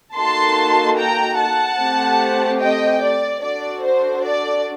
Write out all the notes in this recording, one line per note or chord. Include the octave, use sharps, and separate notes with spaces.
A#3 D#4 F#4 A4 A5 C6
G5 A#5
F#5 A5
A3 C4 G4
D#5 G5
D5
D4 F#4 A4 D5
C5
D5